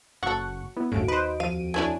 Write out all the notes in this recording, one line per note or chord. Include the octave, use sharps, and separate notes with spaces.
F#1 F#3 A4 F#5 C#6
B3 E4
G1 D#2 A2 C#3 F#4 D7
D#4 B4 C5
F2 F5 D#7
A3 D4 E4 C5 C#5 G#5